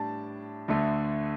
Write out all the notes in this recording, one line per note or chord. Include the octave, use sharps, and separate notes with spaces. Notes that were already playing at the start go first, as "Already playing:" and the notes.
Already playing: A2 G3 D4 A5
D2 D3 A3